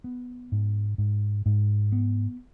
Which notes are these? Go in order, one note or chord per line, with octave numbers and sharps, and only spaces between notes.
B3
G#2
G#2
G#2
B3